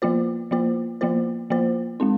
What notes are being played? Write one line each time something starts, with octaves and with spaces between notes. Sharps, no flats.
F3 A#3 F4 C5
F3 A#3 F4 C5
F3 A#3 F4 C5
F3 A#3 F4 C5
G#3 C4 D#4